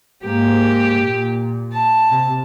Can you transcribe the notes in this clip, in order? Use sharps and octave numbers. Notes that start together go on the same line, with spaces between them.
G#2 A#3 G4
A#2
A5
C3